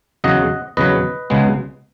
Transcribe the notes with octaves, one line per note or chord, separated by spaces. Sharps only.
E2 C#3 F#3 D#5 F#5
E2 C#3 F#3 B4 D#5
C#2 C#3 G#3 B3